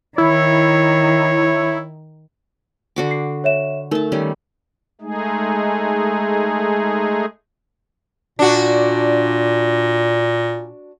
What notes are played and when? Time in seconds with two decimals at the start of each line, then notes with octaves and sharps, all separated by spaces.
0.18 D#3 E4 C#5
2.96 D3 F#4 D6
3.11 C7
3.44 C#5 E5 E7
3.91 A3 D#4 A#4 A5
4.12 D#3 G3 C#4
5.01 G#3 A3 D#4 G#4
8.39 A#2 D4 F#4